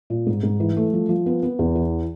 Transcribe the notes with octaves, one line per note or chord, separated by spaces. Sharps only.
A#2
G#2
G#2
E3
A3
F3
F3
B3
B3
E2
E3